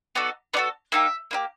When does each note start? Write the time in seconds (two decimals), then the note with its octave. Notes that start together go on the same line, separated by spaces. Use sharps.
0.15 B3 D#4 F#4 A4 D5
0.53 B3 D#4 F#4 A4 D5
0.92 A#3 D#4 G4 E5
1.31 A#3 D#4 G4